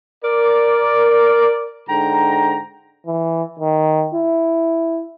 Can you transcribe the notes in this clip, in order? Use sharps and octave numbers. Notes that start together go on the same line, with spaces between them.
A#4 D5
G#2 D3 G5 A#5
E3
D#3
E4